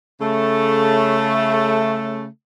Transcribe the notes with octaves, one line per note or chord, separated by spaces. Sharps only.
C#3 A3